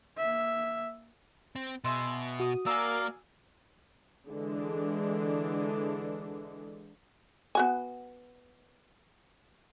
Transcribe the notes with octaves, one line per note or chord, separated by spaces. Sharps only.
A#3 E5
C4
B2 G#4 E5 C6
F#4 D#6
A#3 A#4 D5 F5 G#5 E6
D3 E3 G#3 D4
B3 F#4 G#5